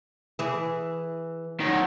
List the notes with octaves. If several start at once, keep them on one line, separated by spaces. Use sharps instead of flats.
E3 G#4
D#3 F#3